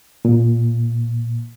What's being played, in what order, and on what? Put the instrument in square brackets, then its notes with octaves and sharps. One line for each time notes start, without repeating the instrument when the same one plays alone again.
[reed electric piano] A#2